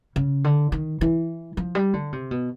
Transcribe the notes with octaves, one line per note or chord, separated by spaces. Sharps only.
C#3
D3
D#3
E3
F3
G3
D3
C3
B2